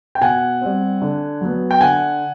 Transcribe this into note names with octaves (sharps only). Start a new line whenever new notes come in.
G5
B2 F#5 G#5
G3 C4
D3
F#3 B3
G5
D3 F#5 G#5